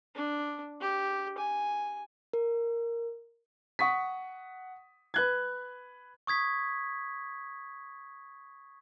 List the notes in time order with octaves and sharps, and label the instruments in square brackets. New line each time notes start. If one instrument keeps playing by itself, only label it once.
[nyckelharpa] D4
G4
G#5
[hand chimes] A#4
[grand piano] F#5 C#6 D#6 B6
B4 F#6 G#6
[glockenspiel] C#6 D#6 G#6 B6